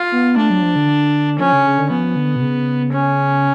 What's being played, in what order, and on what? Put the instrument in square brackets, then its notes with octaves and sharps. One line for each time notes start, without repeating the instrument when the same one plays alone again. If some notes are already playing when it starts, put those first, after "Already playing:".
Already playing: [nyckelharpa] F4
[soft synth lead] B3
[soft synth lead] A3 [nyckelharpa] D4
[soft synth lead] F#3
F3
D3
[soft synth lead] F3 [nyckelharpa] C#4
[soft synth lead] C#3
C#3
D3
[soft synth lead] F3 [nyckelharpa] B3
[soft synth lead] D3
B2
C#3
[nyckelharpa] C#4